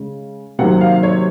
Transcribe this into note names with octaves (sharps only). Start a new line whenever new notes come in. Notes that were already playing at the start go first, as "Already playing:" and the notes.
Already playing: C#3 G#3 C#4
C3 D#3 F#3 A#3 F#5
F5
C#5